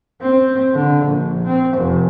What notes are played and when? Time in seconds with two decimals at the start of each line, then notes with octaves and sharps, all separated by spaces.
0.21 C4
0.74 D3
1.05 A#1
1.46 C4
1.77 F1